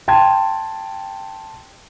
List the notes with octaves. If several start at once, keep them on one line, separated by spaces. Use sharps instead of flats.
G5 A5 C6 G#6